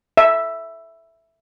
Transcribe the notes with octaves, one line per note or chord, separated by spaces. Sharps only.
E5